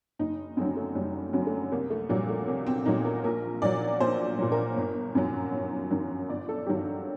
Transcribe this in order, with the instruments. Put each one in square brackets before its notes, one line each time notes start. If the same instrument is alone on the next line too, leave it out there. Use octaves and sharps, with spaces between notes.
[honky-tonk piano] F#1 D#4
F#2 D3 F#3 C4
A3
F#1 G3
F#2 D3 F#3
A3
C2 A#3
A3
A#2 F#3 G3
A3
C2 A#3
C4
A#2 F#3 D#4
A#4
A#1 A#4
A#2 F#3 D5
A#1 C5
A#2 F#3
A#4
G1
F#2 D#3 F#3
G1
F#2 D#3 F#3
G1 D5
A4
G2 D#3 F#3 G4